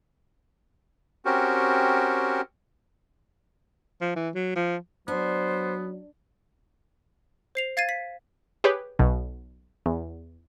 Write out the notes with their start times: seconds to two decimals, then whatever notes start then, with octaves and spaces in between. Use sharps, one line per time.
1.25 C4 C#4 F#4 G4 A#4
4.01 F3
4.16 E3
4.35 F#3
4.56 F3
5.08 F#3 B3 D4 C5
7.55 C5 C7 F7
7.77 F5 G#6 A6 C7 D#7
7.89 B6
8.64 G4 G#4 B4 C#5
8.99 B1 B2
9.86 E2